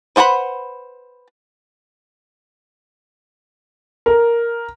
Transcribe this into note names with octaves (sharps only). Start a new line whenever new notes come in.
B4 C5 F#5 G5 B5
A#4